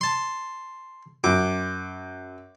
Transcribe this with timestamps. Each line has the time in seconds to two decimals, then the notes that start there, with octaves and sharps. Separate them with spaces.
0.01 A5 C6
1.24 F#2 D6